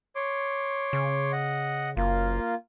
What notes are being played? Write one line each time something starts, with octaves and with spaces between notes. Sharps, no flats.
C#5 C6 D6
C#3
D#5 F#5
F#1 A#3 F4